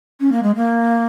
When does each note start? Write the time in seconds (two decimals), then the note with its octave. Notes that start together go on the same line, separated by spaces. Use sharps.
0.20 C#4
0.32 A#3
0.43 G#3
0.56 A#3